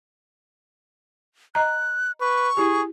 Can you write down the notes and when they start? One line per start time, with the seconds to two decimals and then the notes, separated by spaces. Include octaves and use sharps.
1.55 D#5 A#5 F#6
2.21 B4 C#6
2.57 E4 G4 G#4